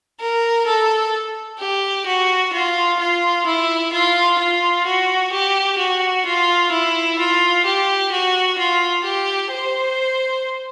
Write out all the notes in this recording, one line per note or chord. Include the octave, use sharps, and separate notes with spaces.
A#4
A4
G4
F#4
F4
F4
E4
F4
F4
F#4
G4
F#4
F4
E4
F4
G4
F#4
F4
G4
C5